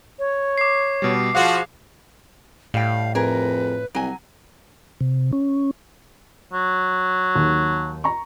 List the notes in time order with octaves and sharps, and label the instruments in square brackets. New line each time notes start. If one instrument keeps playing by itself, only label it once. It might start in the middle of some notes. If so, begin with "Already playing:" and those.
[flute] C#5
[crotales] D6 C7
[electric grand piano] B2 G3
[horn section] F3 F#4 [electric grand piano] G#4 F5
[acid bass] A2 [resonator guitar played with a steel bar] G3 G5 [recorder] F5
[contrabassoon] F2 [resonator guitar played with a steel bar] G#4 A#4 [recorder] B4
[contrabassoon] C2 [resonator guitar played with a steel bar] F#3 G#5
[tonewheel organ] C3
C#4
[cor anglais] F#3
[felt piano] D#2
A#5 C#6